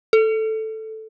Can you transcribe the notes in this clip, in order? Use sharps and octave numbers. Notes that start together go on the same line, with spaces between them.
A4